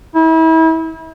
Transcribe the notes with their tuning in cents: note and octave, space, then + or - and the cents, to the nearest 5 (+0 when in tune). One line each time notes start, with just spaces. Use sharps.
E4 -35